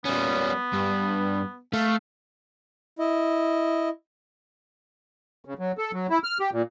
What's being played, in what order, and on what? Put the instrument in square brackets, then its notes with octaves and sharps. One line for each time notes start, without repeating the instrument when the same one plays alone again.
[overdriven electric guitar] G3 C#4 [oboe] B3
[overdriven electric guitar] G2
[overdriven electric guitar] A3 [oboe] F5
[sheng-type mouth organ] E4 D#5
[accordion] C#3
F#3
A4
F#3
E4
F6
G4
A#2